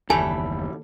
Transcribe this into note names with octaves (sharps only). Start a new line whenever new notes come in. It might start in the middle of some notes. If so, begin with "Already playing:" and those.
F#1 D#2 E3 G3 A3 A4 G#5